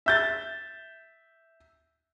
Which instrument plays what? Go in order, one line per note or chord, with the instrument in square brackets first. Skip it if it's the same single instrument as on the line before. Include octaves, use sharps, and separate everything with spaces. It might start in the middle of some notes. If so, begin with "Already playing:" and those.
[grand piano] E5 G6 A6